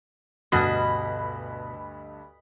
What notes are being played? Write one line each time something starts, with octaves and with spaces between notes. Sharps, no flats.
D2 G2 B2 F#4 D#5 B5